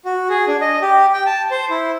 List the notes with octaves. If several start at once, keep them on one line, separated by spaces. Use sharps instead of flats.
F#4
G#4
D4
D#5
G4
G5
A5
C5
E4